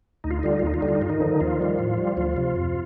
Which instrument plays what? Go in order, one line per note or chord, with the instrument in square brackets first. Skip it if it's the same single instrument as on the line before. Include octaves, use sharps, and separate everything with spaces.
[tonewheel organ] D2 D#4
F4
D#4
D3 G3 F4
D#4
F4
D#2 D#4
F4
D3 G3 D#4
F4
D#4
G2 F4
D#3 D#4
D3 F3
D#2 F3 F4
D#3 G3
A2
G3
D2 F3 F4
C3 F3
F2